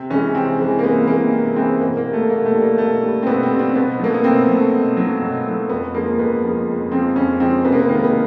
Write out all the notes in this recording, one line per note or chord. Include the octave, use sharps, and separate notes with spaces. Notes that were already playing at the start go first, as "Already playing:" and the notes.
Already playing: C3
E3 G#3 C#4
C3 C4
E3 G#3
A#3
C3 B3
E3 G#3 A#3
C3
E3 G#3 C4
B2 A#3
A#3
G3
A3
B2 A#3
A3
G3
A#3
B2 A3
G3
C4
B2 B3
C4
G3
C4
B2 B3
F#3 A3 A#3
B3
B2 C4
F#3 A3
B2
F#3 A3
B2
F#3 A3
F2 B3
C#3 F3 G#3 A#3
F2 B3
C#3 F3 G#3
F2
C#3 F3 G#3 C4
F2 C#4
C#3 F3 G#3 C4
C3 B3
A#3
B3
D#3 G#3 A#3
B3